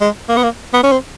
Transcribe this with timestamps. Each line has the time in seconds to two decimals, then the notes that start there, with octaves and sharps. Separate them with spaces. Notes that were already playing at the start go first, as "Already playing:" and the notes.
0.01 G#3
0.29 A#3
0.36 B3
0.43 A#3
0.74 B3
0.83 C#4
0.92 C4